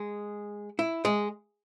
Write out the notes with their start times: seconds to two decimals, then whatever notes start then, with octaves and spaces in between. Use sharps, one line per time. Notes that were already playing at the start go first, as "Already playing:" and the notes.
Already playing: G#3
0.79 E4
1.05 G#3